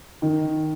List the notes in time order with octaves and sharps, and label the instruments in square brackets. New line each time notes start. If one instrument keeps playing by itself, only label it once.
[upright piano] D#3